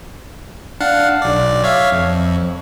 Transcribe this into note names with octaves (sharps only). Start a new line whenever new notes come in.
D4 F5 F#5
B1 D5
C#5 E5 F5
F2